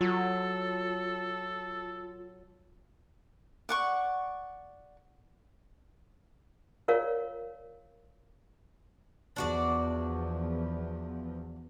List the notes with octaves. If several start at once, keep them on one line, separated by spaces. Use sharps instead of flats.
F#3 F4 A4
D5 F#5 C#6
F4 A#4 C#5 D5 F5
E2 F3 D4 F#4 D5